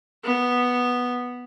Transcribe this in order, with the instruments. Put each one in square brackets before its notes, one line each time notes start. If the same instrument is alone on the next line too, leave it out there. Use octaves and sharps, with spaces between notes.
[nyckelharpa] B3